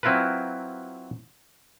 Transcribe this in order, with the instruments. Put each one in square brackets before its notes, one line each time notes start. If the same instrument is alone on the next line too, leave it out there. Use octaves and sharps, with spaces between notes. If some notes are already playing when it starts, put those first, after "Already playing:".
[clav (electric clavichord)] F#3 C4 E4 F4 A#4 B4